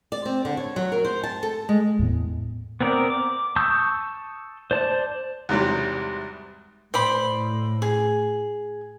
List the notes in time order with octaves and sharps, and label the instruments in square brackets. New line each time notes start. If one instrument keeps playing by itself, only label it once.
[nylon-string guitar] D5
C4
D3
C#5
F#3
A#4
C5
A5
A4
G#3
[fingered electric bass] E2 A2 B3
[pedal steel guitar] B3 C4 A#4 D5
D6
A5 C#6 D#6 E6 G6
C5 D5 A5
[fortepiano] E2 G#2 C3 F#3 G3
[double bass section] A2 [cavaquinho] C5 D5 B5
[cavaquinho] G#4